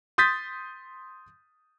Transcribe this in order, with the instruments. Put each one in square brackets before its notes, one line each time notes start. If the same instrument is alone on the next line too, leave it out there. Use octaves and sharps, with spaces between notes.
[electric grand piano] C6 D#6 G6 A6 B6